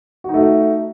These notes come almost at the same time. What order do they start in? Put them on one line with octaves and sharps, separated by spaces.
F#4 D#4 A3